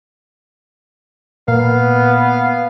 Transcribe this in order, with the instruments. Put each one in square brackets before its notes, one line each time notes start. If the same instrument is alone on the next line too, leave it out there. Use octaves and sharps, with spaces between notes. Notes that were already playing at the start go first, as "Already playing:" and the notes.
[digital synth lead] A#2 [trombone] B3 [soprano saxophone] F5